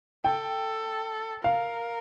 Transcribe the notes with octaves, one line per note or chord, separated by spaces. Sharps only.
A4 G5
A#4 F5